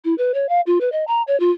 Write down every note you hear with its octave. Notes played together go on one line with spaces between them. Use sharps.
E4
B4
C#5
F5
F4
B4
D#5
A#5
C#5
F4